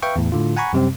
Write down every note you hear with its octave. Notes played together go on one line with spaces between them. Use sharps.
B4 E5 F5 G5 C#6
E2 A2
A2 D3 F4
F#5 G#5 A#5 B5 C#6
F#2 C3 G3 C4